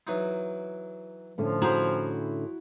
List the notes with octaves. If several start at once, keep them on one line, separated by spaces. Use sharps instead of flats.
E3 F#3 D#4
A2 D3 F3 C#4
E4 F#4 G#4 C5 A#5